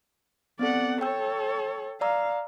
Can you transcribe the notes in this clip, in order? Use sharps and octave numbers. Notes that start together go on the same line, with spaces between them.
B3 C4 A4 D5 F#5
A4 C#5 G5 E6
D5 F5 A#5 E6